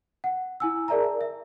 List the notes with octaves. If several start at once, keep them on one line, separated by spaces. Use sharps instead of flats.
F#5
E4 G#5 E6
G#4 A#4 D5 E5 A5 A#5
E5
E5